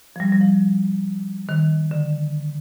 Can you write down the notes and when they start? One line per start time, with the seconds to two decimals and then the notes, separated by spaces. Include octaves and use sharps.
0.16 F3
0.20 G3
0.32 G3
0.41 F3
1.49 D#3
1.91 D3